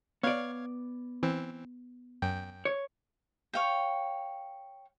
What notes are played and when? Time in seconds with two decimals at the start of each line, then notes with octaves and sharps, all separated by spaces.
0.23 B3 C#5 D5 F5 G#6
1.23 E3 C4
2.22 F#2 G5
2.65 C#5
3.53 C#5 F5 G5